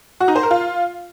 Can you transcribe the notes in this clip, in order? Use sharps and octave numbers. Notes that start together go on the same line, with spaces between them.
F#4
D#4
C5
A#4
F4